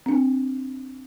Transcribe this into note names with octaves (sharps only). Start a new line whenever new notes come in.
C4 D4